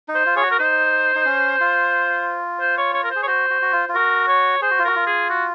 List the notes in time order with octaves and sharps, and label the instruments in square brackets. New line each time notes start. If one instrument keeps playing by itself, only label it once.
[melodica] D#4
[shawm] C5
[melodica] F4
[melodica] G#4 [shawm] C#5
[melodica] F#4
[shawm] A#4
[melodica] D#4 [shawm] C5
[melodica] D#4
C#4
F4
[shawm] C5
C#5
C#5
A#4
[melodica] G#4 [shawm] C5
[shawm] C#5
[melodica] F#4 [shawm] C5
[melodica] F#4
F#4
F4
F4
[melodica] F#4 [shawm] A#4
[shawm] C#5
[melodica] G#4 [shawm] C5
[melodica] F#4
F4
[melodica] F#4 [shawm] A#4
[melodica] F4
[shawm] G#4
F#4